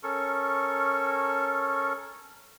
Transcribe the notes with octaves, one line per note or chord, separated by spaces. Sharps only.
C#4 A4 A#4 C#6